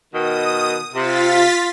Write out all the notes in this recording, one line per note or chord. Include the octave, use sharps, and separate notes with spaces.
B2 D#3 D#6
C3 F4 A6 B6